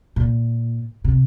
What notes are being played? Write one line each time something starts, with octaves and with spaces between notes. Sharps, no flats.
A#2
C3